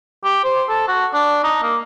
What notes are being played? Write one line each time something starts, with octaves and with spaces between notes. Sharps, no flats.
G4
C5
A4
F#4
D4
D#4
A#3